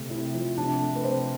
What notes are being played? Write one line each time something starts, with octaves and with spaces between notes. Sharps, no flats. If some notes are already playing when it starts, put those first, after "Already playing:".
Already playing: C3 A3
C3 E4
F3
C3 D4
A3
B4
C3 C5